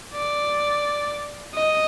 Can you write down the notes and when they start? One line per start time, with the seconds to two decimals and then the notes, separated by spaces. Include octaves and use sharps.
0.13 D5
1.55 D#5